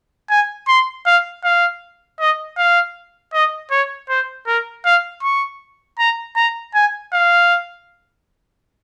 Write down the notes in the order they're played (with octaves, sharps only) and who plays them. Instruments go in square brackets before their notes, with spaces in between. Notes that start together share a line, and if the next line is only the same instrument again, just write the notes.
[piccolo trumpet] G#5
C6
F5
F5
D#5
F5
D#5
C#5
C5
A#4
F5
C#6
A#5
A#5
G#5
F5